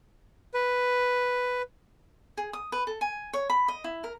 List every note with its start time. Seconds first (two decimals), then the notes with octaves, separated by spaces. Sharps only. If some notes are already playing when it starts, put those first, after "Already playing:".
0.54 B4
2.37 G#4
2.53 D#6
2.72 B4
2.87 A4
3.01 G#5
3.33 C#5
3.50 B5
3.68 D#5
3.84 E4
4.04 A#4